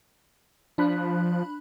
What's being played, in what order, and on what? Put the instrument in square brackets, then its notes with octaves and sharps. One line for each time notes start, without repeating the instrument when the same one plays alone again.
[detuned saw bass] F3 [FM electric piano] D4 B5 F#6